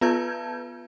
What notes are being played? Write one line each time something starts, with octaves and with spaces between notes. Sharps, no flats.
B3 F4 B4 A5 G6 G#6